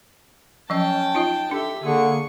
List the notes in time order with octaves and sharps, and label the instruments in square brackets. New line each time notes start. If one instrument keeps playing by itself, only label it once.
[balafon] F3 F#3 D#5 [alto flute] C#4 [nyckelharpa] G5 A5
[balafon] D#4 F4 D#5
[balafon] D4 [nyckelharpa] G4 E5 [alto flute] A4
[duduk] D3 [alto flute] A#3 [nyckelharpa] G#4 C#6